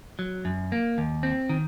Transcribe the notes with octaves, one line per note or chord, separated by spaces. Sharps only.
F#3
F#2
A#3
D#2
C4
D#3